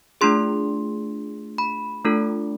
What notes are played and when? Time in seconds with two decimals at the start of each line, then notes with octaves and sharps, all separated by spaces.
0.21 A3 D4 F4 G#4 C6
1.58 B5
2.05 A3 D4 F4 A4